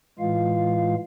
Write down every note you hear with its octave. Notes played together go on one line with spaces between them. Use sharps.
A2 E3 G#3 F4 F5